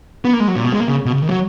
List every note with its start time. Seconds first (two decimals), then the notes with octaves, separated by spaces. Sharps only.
0.25 B3
0.33 A#3
0.40 G#3
0.48 F#3
0.56 A#2
0.64 B2
0.72 G#3
0.80 A#3
0.88 C#3
1.05 B2
1.12 C#3
1.22 D#3
1.29 F#3